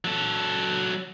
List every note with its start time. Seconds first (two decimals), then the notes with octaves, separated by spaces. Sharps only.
0.05 F#3 A4